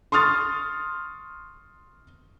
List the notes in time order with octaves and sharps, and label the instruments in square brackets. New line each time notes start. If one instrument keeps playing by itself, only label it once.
[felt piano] C6 C#6 D#6 F6 A6